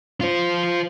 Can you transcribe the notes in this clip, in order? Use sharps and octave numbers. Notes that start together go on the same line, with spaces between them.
F4 C5